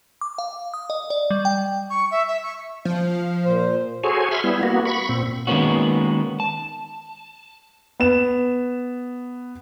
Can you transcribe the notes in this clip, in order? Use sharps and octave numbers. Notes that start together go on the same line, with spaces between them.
D6
F5
D#6
D#5
D5
G3
G5
C#6
E5
E5
C#6
F3
A#2 C5
F#4 G#4 A4 C5 C#5 G#5
E5 G#5 B5 C6 F6
G3 B3 E4
A#3 B3 F#4
B5 C#6
A#2 C4
D#3 G#3 A#3 B3 C#4 F#4
A5
B3 E7